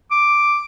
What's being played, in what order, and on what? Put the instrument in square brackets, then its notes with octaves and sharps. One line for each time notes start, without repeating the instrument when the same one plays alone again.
[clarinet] D6